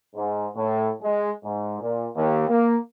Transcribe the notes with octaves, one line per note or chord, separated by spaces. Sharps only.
G#2
A2
G#3
G#2
A#2
D#2
A#3